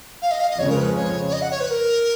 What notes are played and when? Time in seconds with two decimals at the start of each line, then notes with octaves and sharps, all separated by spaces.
0.22 F5
0.31 D#5
0.40 F5
0.50 D#5
0.59 F2 C#3 G#3 C#4 C#5
0.69 A#4
0.77 B4
0.96 C#5
1.28 C#5
1.33 D#5
1.42 F#5
1.51 C#5
1.61 B4
1.70 A#4